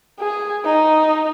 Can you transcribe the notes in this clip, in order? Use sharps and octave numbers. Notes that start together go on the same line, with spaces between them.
G#4
D#4